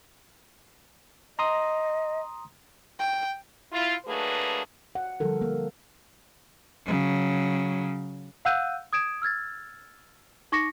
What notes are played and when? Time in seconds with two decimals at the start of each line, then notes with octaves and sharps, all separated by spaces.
1.39 D#5 A#5 C6 D#6
2.99 G5
3.72 E4 F4
4.06 F#3 A3 A#3 D4 G#4 B4
4.95 F#5
5.20 D3 F3 G3 A4 A#4
5.42 A#3
6.86 C#3 F#3
8.45 F5 F#5 E6 F#6 G6 D#7
8.93 D#6 G#6 D7 E7
9.22 E6 F6 G#6 A6
10.52 D#4 C#6 D6 A#6 C#7